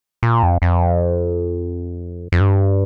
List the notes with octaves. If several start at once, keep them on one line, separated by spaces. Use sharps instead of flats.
A#2
F2
F2
F2
G2